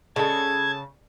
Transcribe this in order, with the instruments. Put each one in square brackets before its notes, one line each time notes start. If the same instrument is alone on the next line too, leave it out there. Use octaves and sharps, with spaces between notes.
[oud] C#3 [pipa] G#3 A4 [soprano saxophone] A5 [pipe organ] G#6